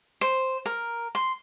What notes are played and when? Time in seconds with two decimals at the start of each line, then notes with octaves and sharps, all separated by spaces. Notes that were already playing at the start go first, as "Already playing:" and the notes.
0.21 C5
0.66 A#4
1.15 C6